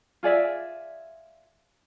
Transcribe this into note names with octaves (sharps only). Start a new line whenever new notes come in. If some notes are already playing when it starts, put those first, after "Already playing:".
F4 G#4 D5 E5